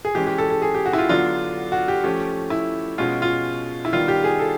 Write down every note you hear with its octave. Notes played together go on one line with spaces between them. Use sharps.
G#4
E3 G#3 C#4 G4
G4
A4
A4
G#4
G4
F#4
E4
F4
D3 F#3 B3 D4 F4
F#4
G4
F3 A3 C#4 G4
E4
B2 G#3 C#4 F4
F4
E4
D#3 G3 B3 F4
G4
G#4
A4